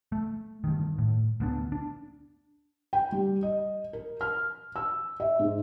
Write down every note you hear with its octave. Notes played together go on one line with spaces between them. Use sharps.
A3
G2 D#3
A2
D2 B3 D4
D4
G5
G3
D#5
A#4
F6
E6
E5
G#2